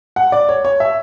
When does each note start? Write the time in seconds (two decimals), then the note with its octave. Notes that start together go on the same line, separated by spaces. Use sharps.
0.16 F#5
0.32 D5
0.49 C#5
0.65 C#5
0.80 E5